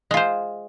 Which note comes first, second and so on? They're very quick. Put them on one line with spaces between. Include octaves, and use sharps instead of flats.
G#3 F4 C5